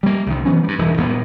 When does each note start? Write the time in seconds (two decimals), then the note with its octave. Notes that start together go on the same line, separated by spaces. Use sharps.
0.03 G3 A#3
0.26 C2 D#3
0.45 E3 F#3 B3 C#4
0.63 G2 G3
0.78 E1 G2 E3
0.97 D#1 A#2 A#3 B3